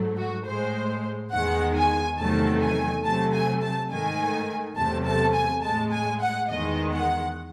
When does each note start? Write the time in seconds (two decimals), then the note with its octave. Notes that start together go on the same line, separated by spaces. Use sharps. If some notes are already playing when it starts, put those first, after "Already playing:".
Already playing: G#2 F#3 A3
0.16 F#4
0.45 A2 G#3 C5
1.31 E2 D#3 G#3 F#5
1.75 G#5
2.18 E2 C3 D#3 F#3 A3 A5
2.61 G#5
3.04 C3 F#3 A3 A5
3.33 G#5
3.61 A5
3.90 G#2 D#3 A3 G#5
4.76 E2 C3 F#3 A3 A5
5.06 A5
5.34 G#5
5.63 A2 G#3 A5
5.92 G#5
6.20 F#5
6.49 E2 D#3 G#3 D#5
6.93 F#5